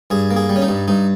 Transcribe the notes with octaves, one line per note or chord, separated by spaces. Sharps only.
G2 G#4
A#3
G#4
G3
C#4
D#4
G2
G2 D#4